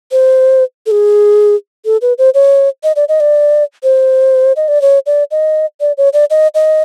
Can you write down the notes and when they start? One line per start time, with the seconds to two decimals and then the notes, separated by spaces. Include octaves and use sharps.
0.12 C5
0.86 A4
0.91 G#4
1.85 A4
2.02 B4
2.18 C5
2.34 C#5
2.84 D#5
2.96 D5
3.09 D#5
3.20 D5
3.83 C5
4.56 D#5
4.68 D5
4.82 C#5
5.06 D5
5.31 D#5
5.81 D5
5.98 C#5
6.13 D5
6.30 D#5
6.55 D#5